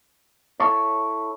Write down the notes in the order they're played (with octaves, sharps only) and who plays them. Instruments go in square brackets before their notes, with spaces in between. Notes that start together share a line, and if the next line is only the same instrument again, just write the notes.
[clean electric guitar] E4 A4 C#5